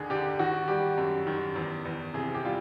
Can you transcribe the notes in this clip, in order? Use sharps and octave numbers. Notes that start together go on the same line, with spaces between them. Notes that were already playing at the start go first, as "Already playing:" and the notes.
Already playing: D#2 D3 G#4
D3 G4
D#3 F#4
G3 G4
F#2
D#3
E2
E2
C3 G#4
G4
G3 F4